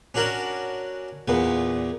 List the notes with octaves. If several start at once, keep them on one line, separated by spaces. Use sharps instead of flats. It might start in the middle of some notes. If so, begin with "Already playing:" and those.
C#4 D4 F#4 A#4 F#5 A5
E2 A#2 B3